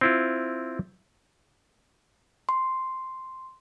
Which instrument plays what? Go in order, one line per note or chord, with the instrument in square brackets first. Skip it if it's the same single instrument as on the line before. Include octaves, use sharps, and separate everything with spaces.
[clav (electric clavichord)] C4 E4 F4
[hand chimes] C6